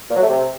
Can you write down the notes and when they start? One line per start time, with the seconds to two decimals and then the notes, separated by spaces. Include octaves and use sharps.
0.10 A#2
0.16 F#3
0.22 A3
0.28 C3